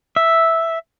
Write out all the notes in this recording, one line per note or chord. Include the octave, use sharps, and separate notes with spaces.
E5